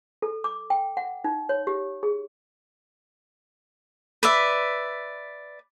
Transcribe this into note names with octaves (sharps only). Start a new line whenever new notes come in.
A4
D6
G5
F#5
D#4
C#5
G4
G#4
B4 D5 E5